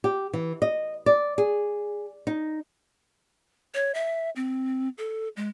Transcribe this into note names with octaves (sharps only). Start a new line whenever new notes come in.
G4
E3
D#5
D5
G#4
D#4
C#5
E5
C4
A4
G#3